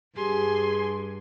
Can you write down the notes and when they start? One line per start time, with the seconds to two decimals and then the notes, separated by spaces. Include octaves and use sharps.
0.16 G2 G4 G#4 G#5 C6